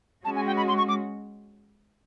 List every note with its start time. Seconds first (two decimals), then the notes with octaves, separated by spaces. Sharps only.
0.25 G#3 C#4 F#4 A5
0.36 G#5
0.47 G5
0.57 B5
0.68 C6
0.78 C#6
0.89 D6